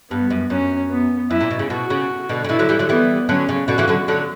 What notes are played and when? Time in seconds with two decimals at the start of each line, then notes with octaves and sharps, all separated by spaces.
0.11 G2 B3
0.30 F#2
0.50 F#2 C#4
0.91 B3
1.30 F#2 E4
1.41 A#2
1.51 B2
1.59 C#3
1.70 B2 F#4
1.90 C#3
2.29 B2 D3
2.44 C#3
2.49 B2 D3 E4
2.59 D3 F#3
2.69 E3 G3
2.79 D3 F#3
2.89 E3 G3 B3
3.28 D3 F#3 C#4
3.49 C#3
3.68 B2 D3 F#4
3.78 C#3 E3
3.88 D3 F#3
4.08 D3 F#3